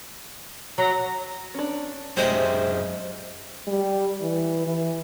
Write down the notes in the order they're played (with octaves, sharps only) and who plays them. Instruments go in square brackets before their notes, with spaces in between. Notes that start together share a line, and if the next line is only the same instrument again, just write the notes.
[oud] F#3 [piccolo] A#5
[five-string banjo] C#4 D4
[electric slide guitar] F#2 G#4 D#5 [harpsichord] C3 G#3 C4 [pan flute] C5
[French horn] G3
E3
E3